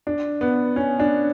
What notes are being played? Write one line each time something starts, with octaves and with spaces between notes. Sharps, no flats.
D4
B3
C#4
D4